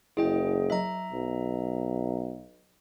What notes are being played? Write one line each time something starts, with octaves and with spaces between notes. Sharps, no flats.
F#1 E4 G#4 D#5 G5
F#3 D#5 E5 A#5
B1